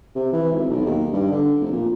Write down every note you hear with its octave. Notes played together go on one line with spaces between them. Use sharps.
C3
E3
G#1
B1
D#2
G2
D3
F1
A#2